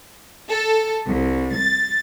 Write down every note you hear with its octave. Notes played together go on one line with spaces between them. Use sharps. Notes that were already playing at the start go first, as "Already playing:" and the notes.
A4
C2
A6